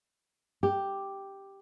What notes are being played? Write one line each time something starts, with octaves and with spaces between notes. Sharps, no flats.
G4